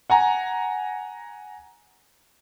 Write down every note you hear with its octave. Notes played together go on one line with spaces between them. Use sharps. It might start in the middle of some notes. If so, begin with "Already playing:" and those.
F#5 G#5 A#5